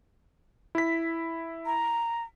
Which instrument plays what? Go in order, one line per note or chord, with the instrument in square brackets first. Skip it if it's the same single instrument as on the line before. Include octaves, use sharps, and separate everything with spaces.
[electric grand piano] E4 B6
[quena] A#5